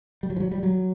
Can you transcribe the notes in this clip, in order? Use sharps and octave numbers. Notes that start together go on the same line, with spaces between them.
G3
F#3
F3
F#3
G3
F#3